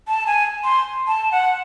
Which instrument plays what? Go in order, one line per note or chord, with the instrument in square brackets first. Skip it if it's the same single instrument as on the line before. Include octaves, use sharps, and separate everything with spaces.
[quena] A5
G#5
C6
A5
F#5